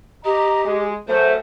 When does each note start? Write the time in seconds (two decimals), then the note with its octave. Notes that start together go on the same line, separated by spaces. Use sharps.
0.25 G4 D#5 A#5
0.65 G#3
1.08 F#2 A3 C5